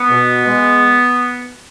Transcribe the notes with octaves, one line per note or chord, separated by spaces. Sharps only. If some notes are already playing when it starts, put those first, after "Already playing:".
Already playing: B3
B2
G#3